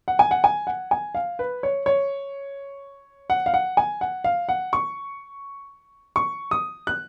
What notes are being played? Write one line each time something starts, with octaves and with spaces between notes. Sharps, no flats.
F#5
G#5
F#5
G#5
F#5
G#5
F5
B4
C#5
C#5
F#5
F5
F#5
G#5
F#5
F5
F#5
C#6
C#6
D#6
F#6